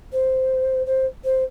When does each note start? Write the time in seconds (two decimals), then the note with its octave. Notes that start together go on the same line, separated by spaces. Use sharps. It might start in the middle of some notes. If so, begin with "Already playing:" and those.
0.12 C5
0.86 C5
1.24 C5